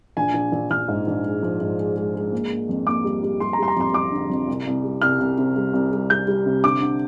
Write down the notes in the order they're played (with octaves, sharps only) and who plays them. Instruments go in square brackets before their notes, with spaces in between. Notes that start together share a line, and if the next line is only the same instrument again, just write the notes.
[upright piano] A#1 G#5
A#1
A#1
A#1 F6
G#2
A#1
G#3
F3
G#2
G#3
G#3
G#3
A#3
A#3
F2
A#3 D6
G3
G3
G3 C6
A#5
G3 C6
A#5
F2 C6
F2 D6
D3
F2
C2
C2
G3
C2 F6
C2
C3
G3
C2
G3
G3 G6
G3
C3
D3 D6
D3